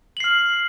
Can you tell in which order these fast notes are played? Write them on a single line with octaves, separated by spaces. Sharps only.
F#7 C7 F6